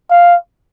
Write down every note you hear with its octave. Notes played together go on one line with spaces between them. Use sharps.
F5